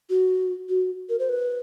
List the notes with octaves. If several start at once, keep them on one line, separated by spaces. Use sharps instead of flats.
F#4
F#4
A#4
C5
B4